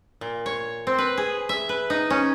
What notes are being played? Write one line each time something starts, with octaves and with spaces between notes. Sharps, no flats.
A#2
C#5
C4
B4
G#4
E5
B4
D#4
C#4